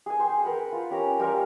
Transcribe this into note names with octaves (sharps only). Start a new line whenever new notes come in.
G#4 G#5
C5 G5
A#4 B4 F#5
F4
C#4 G4 A#4 A#5
G3 A#4 C6